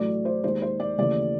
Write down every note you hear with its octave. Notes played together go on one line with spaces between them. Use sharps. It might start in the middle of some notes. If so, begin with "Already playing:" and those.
Already playing: A1 A2 F#3 A3 D5
C5
D#2 D#3 G#3 C5
C5
D5
D#2 C#3 E3 A3 D5